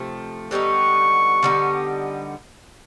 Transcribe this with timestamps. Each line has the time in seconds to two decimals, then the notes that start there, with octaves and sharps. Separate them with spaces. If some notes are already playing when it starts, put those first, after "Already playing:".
Already playing: C3 F3 A3
0.51 D3 G3 B3 D#4 C#6
1.43 D3 G3 B3 D#4